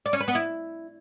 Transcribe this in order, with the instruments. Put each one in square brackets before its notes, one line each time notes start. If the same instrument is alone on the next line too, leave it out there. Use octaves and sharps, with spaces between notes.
[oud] D5
C#4
B4
B3
E4